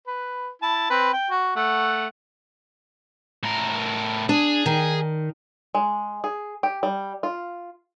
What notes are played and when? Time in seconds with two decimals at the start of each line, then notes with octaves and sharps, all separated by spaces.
0.07 B4
0.62 E4 A5
0.90 C4 B4
1.13 G5
1.31 F#4
1.56 A3 F#5
3.43 A2 A#4
4.29 D4 G#4
4.66 D#3
5.75 G#3
6.24 G#4
6.63 G4
6.83 G3
7.23 F4